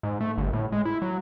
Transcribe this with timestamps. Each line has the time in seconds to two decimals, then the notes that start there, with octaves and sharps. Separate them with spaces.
0.03 G#2
0.21 A3
0.38 G1
0.53 A2
0.72 G#3
0.85 E4
1.02 F#3